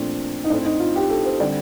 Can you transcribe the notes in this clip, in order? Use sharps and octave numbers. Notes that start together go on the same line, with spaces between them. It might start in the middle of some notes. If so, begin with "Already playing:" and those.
Already playing: A#2 F3 A3 C4 D4
D#4
A2 A3 C4 D4
D#4
F4
G4
A4
C5
D3 G3 C4 D5